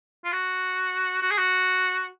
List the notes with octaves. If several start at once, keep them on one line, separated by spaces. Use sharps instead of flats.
F4
F#4
F#4
G#4
F#4